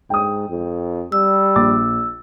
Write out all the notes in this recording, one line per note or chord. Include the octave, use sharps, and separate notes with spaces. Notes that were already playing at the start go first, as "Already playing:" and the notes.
G#2 G5 D#6
F2
G3 E6
A#1 D6 A6